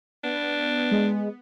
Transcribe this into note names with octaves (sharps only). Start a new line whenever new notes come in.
B3 D4
G#3